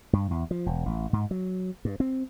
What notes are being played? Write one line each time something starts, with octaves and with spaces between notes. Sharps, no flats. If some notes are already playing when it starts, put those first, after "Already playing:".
G2
E2
F3
E1
A1
G#2
F#3
G2
C4